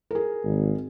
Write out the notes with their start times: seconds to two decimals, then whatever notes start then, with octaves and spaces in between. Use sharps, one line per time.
0.11 G#4 A#4
0.44 G#1